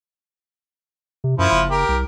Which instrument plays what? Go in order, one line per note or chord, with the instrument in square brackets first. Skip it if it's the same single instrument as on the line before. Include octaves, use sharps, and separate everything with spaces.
[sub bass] C3
[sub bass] F#2 [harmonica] F3 E4
[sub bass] F#1
[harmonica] G4 A#4
[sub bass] C2